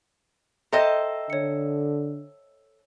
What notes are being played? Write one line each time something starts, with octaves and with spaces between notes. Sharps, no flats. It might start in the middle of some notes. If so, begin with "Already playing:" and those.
A4 C5 D#5 E5 G5 A#5
D3 C#5 C#7